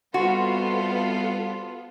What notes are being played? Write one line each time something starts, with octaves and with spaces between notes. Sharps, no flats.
C3 G3 B3 F4 F#4 A4 C6